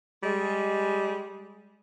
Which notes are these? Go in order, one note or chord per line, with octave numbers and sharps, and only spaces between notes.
G3 G#3